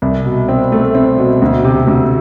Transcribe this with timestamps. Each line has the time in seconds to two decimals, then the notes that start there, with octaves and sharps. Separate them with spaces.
0.02 C2
0.25 B2
0.49 C4
0.72 A3
0.95 C4
1.18 B2
1.42 D2
1.64 C3
1.88 D2